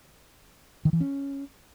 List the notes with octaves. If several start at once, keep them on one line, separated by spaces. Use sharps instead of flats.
D#3
E3
C#4